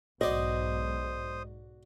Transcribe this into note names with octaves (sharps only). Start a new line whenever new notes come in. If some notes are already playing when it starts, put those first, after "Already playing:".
B1 G#2 F#4 C5 D5 D#5 D#6